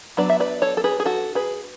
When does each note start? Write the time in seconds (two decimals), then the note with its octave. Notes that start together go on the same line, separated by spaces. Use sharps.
0.17 F#3 B3 D4 B4 D5
0.29 E5
0.40 B4 D5
0.62 A4 C#5
0.77 A4
0.84 G#4 B4
1.00 G#4
1.05 F#4 A4
1.35 G#4 B4